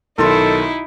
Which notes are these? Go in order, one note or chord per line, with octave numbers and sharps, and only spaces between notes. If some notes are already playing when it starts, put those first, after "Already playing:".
B1 D#3 D#4 E4 A4 C6